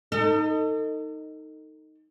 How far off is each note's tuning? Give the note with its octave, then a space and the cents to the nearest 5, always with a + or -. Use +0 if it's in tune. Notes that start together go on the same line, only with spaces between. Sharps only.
D#4 +0 A4 +40